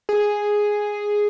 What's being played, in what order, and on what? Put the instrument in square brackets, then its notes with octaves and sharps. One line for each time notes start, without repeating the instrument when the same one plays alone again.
[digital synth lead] G#4